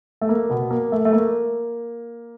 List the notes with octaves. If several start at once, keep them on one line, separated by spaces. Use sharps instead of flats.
A3
A#3
B2 B3
A#3
A3
A3
A#3